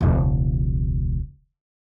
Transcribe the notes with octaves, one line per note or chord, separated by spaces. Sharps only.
E1 C#2